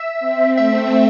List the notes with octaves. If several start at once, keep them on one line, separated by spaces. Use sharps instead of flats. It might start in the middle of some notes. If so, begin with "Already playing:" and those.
Already playing: E5
C4
A3 E5